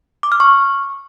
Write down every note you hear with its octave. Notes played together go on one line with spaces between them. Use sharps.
D6
F6
C#6